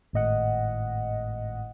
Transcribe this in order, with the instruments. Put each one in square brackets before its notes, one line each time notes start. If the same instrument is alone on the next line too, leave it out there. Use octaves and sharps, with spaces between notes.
[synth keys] G#1 A2 D#5 F#5